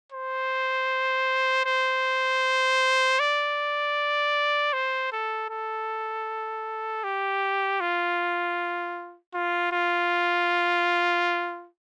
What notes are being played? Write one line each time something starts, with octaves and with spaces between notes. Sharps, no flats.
C5
C5
D5
C5
A4
A4
G4
F4
F4
F4